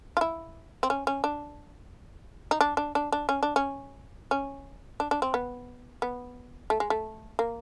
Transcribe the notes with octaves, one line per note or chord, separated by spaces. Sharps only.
F4
E4
C4
C#4
C#4
D4
D#4
D4
D4
D4
D4
C#4
D4
C#4
C#4
D4
D4
C4
B3
B3
A3
G#3
A3
A#3